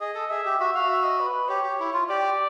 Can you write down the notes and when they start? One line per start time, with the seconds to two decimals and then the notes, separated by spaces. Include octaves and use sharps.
0.01 G#4 D#5
0.15 A4
0.31 G#4 E5
0.45 G4
0.59 F#4 E5
0.75 F#4 F5
0.90 E5
1.04 D#5
1.20 B4
1.49 G4 C#5
1.64 G4
1.80 E4
1.93 F4
2.09 G4 D5